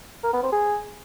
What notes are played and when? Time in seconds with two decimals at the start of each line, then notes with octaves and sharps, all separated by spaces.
0.24 A#4
0.33 B3
0.43 C4
0.52 G#4